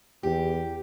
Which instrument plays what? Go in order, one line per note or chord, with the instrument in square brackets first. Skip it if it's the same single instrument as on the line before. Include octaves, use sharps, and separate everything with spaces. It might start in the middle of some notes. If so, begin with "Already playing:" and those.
[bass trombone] E2 [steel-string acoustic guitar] G4